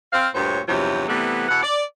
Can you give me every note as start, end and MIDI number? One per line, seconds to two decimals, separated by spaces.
0.13 0.28 60
0.13 0.28 77
0.35 0.60 38
0.35 0.60 43
0.35 0.60 46
0.35 0.60 72
0.35 0.60 73
0.68 1.05 40
0.68 1.05 43
0.68 1.05 48
0.68 1.05 53
0.68 1.05 54
0.68 1.05 73
1.09 1.47 48
1.09 1.47 52
1.09 1.47 55
1.09 1.47 57
1.09 1.47 59
1.49 1.62 40
1.49 1.62 47
1.49 1.62 76
1.49 1.62 78
1.63 1.82 74